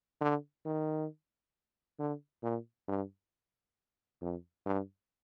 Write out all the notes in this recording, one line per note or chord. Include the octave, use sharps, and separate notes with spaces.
D3
D#3
D3
A#2
G2
F2
G2